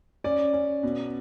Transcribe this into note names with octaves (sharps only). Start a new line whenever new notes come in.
C#4 D5
C#4
B2